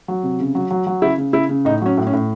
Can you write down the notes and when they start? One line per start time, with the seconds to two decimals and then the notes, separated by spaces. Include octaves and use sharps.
0.08 F#3
0.23 C3
0.40 C#3
0.55 F#3
0.71 F#3
0.87 F#3
1.02 C#3 E4
1.18 C#3
1.33 C#3 E4
1.49 C#3
1.65 A2 D#4
1.82 F#3 C#4
1.97 A2
2.07 C#4
2.13 A2